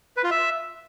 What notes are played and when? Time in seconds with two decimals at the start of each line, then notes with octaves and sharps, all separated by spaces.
0.17 B4
0.24 F4
0.31 E5